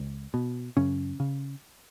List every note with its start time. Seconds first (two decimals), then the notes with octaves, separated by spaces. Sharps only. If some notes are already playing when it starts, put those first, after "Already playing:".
Already playing: C#2
0.34 B2
0.77 F#2 C#3 C#4
1.20 C#3